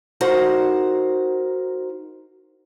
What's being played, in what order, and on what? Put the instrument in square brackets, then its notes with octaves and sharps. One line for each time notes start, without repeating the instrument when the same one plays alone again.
[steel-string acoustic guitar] D#4 F#4 A#4 C5 F#5